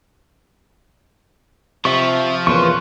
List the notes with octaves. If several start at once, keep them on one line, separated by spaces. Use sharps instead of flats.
C3 F3 E5 C#6
E2 A#2 C#3 B4 C6 C#6